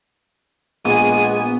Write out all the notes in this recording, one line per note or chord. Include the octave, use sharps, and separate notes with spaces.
A#1 G#3 B3 G#5 D#7